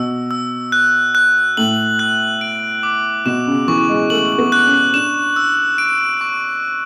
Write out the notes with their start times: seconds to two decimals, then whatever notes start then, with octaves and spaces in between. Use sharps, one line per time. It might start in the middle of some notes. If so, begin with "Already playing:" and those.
Already playing: B2 E6
0.31 E6
0.72 F#6
1.15 F#6
1.57 A2 F#7
1.99 F#6
2.41 D7
2.83 D6
3.26 B2 E7
3.47 C#3
3.67 E3 C#6
3.89 G#3
4.10 A3 F#7
4.38 B3
4.52 F#6
4.66 C#4
4.94 D4 E7
5.36 E6
5.78 D7
6.21 C#6